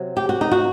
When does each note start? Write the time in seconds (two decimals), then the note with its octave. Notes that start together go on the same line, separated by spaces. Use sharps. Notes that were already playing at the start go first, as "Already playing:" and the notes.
Already playing: C3 F#3
0.17 G4
0.29 F#4
0.41 D#4
0.51 F#4